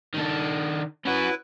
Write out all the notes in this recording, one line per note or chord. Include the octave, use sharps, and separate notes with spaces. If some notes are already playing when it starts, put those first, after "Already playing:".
D#3 D4
C#4 E4 F#4 B4